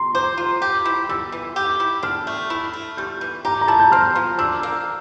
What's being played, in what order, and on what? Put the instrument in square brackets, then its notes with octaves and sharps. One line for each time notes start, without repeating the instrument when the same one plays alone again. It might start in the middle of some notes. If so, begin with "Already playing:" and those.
Already playing: [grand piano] A#5 C6
[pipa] C5 [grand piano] D6
[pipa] F4
G4
E4
[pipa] G3 [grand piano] E6
[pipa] E3
G4
E4
[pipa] D4 [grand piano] F6
[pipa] A3
E4
A3
[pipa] G3 [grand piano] G6
[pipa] E3
[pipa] G4 [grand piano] A#5
[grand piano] A#5
[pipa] E4 [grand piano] A5
[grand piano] G6
[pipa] C4 [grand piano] F6
[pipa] F3
[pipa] D4 [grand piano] E6
[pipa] A#3